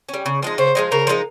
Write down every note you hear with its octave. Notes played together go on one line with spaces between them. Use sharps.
G3 C#4
C#3
F3 G#3 D#4
C#3 C5
F3 G#3 D#4
C#3 A#4
F3 G#3 D#4